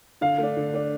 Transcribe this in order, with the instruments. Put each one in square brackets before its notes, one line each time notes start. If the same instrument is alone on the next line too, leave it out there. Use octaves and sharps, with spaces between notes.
[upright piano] D3 [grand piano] F5
[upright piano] A3 D4
D3
A3 D4